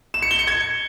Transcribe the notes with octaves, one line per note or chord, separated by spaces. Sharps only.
E7
C#7
G7
C#7
G#6